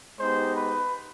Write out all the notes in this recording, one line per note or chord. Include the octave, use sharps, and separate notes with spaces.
G#3 B3 D#4 G4 C5
B4